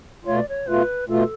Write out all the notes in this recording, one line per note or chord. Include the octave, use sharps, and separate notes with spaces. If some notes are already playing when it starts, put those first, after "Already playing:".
B2 A3 F4 C#5
D5
C#5
B2 A3 F4 B4
B2 A3 F4 A4